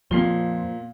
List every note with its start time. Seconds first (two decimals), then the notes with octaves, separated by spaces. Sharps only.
0.11 F2 A#2 F3 C7 G7